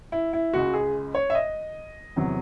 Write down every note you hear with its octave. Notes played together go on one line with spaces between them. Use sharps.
E4
E4
C#2 C#3 G#3 F#4
G#4
C#5
E5
D#5
E2 C3 F#3